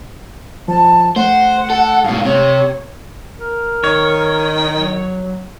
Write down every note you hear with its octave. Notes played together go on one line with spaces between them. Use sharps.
F3 A5
A3 C5 F#5
A4
G#2 B2 F5
C3 C#5
A#4
D#3 C#5
F#3